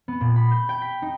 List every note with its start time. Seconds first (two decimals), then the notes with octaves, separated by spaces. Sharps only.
0.08 B3
0.21 A#2
0.36 B5
0.51 G6
0.69 G5
0.82 B6
1.02 D#4